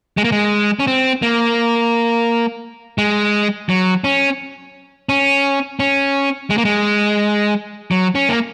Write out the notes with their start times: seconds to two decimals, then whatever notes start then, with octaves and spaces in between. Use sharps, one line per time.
0.17 G#3
0.24 A#3
0.32 G#3
0.80 C#4
0.87 C4
1.22 A#3
2.98 G#3
3.69 F#3
4.04 C#4
5.09 C#4
5.80 C#4
6.50 G#3
6.58 A#3
6.65 G#3
7.91 F#3
8.15 C#4
8.29 A#3